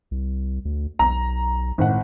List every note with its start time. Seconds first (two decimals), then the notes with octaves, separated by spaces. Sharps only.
0.11 C2
0.65 D2
0.99 B1 A#5
1.78 G#1 A2 F#5